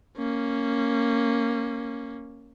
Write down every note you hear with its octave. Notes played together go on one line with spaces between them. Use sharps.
A#3 C#4